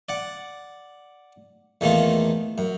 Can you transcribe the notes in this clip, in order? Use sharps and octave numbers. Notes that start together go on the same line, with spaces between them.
D5 F#5
E2 D#3 A3 A#3 F4
F#2